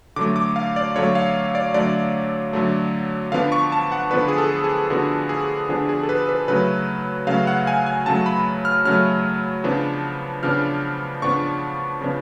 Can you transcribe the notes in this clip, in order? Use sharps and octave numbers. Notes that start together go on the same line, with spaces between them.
D3 F#3 A3 D6
D6
F5
D5
D3 F#3 A3 C#5
F5
D5
D3 F#3 A3 D5
D3 F#3 A3
D3 F3 B3 D4 F5
C#6
A5
F#5
D3 F3 B3 D4 B4
G#4
A4
G#4
D3 F3 B3 D4 F#4
G#4
D3 F3 B3 D4 G#4
G#4
A4
B4
B4
C#3 F#3 A3 B4
C#3 F#3 A3 F5
F#5
G#5
G#5
C#3 F#3 A3 A5
B5
F6
C#3 F#3 A3 F6
C#3 F3 B3 D4
C#3 F3 B3 D4 F6
C#3 F3 B3 D4 C#6
C#3 F3 B3 D4